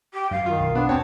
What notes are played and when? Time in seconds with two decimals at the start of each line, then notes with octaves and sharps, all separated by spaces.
0.14 G4
0.31 F#2 F5
0.46 D#3 F4
0.59 B1
0.75 B3 D4
0.89 E1 C4 C#5 A5